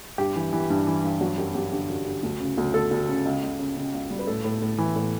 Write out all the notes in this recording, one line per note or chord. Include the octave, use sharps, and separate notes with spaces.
G2 G4
E3
E3
G2
E3
G2
F#3 F#4
F#2 G4
F#3 G4
D3 G4
F#2
D3
D2
C#3
D2
D2 A4
D2
C#3
C#2
C#2
C#3
C#3
C#2
G3
B4
A2 A4
A2
A2
E3
A2